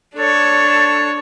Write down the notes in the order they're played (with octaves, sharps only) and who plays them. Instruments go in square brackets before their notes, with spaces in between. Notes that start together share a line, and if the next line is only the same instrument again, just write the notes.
[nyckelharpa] D4 C#5 [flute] A4